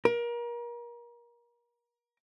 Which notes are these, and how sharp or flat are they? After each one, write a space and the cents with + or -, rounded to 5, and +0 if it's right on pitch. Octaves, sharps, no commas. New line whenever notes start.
A#4 +30